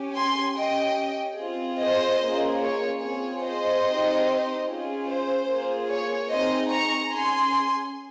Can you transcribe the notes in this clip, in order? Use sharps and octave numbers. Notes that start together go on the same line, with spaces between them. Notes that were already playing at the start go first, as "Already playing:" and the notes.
Already playing: C#4 G4
G#5 C6
C#4 G4 D#5 G5
C4 F4 G#4
C5 D#5
A#3 C#4 F4 G#4
C#5
C4 F4 G#4 C#5
C5 D#5
C4 D#4 G4
C#4 F4 G#4
C5
A#3 F4 G#4
C#5
C4 D#4 G#4 C5 D#5
A#5 C#6
C#4 G#4 G#5 C6